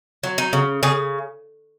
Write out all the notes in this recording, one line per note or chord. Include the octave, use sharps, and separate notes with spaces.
F#3
D#4
C#3
C#3 G#4